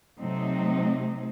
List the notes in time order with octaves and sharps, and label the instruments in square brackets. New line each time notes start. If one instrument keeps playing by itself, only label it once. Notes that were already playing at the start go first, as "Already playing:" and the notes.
[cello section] C3 F#3 A3 C4 D#4